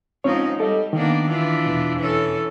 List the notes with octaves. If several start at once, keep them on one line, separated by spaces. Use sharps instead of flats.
G#2 F3 C4 C#4 D#4 C#5
G3 A4 D#5
D#3 A#3 B3 D4
E3 D4 F4
E2 B2
E3 C#4 A4